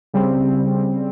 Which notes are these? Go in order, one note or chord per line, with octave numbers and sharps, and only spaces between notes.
C#3 G3 C4